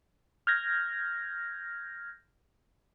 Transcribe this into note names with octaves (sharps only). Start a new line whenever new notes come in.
F6 G6 G#6 A#6